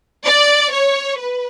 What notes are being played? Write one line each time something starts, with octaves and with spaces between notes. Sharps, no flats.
D5
C#5
B4